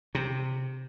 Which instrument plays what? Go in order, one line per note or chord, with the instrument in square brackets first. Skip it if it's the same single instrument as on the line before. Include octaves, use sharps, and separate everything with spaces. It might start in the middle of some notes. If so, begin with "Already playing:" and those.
[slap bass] C3